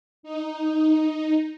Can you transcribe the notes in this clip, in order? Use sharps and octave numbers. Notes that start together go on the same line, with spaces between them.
D#4